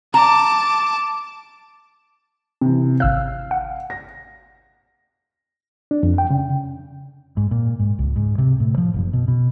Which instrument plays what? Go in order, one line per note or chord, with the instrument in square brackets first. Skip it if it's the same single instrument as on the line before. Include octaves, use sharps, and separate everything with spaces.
[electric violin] A5 D6 [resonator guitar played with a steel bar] A#5
[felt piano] C3 E3 [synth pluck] C4
[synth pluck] G#1 E6 F#6 [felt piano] F5
[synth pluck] F#5
[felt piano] A#6
[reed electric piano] D4
F2
G5
C#3
[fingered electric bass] G#2
A#2
G#2
C#2
G#2
C3
A2
F3
F#1
B2
B2